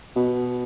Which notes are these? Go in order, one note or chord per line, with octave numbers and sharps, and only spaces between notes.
B2